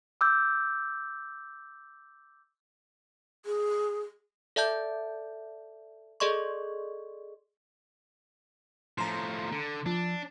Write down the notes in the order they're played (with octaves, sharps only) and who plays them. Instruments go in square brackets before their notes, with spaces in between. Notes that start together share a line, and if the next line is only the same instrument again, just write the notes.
[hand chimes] D6 E6 G6
[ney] G#4
[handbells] A4 D5 E5 A5 G6
G#4 A4 D5 D#5 C6 C#6
[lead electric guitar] A2 F3 [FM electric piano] A#5 C6
[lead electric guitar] D3
[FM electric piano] F3 [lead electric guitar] D4